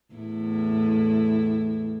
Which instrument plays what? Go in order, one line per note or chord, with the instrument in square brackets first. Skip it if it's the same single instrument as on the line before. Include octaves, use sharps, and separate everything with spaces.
[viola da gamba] E2 A2 E4